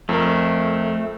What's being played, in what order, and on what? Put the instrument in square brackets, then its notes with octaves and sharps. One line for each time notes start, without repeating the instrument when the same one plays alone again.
[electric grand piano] F2 A#4 [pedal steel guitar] A3